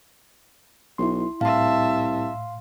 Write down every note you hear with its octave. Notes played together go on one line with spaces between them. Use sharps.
B1 E4 C6
C2 A2 E5 F5 A5 C6